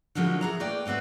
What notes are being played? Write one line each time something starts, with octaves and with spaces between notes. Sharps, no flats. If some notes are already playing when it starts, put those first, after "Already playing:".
D3 D#3 F3 F#3 G#3 C#4
E3 G#4 A#5
A3 A#3 B4 D5 G5
F#3 A3 C4 F#4 B4